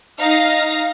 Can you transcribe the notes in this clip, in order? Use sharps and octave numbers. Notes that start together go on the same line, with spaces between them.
D#4 F5 A#6